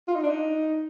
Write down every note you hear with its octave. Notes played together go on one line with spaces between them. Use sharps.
F4
D#4
D4
D#4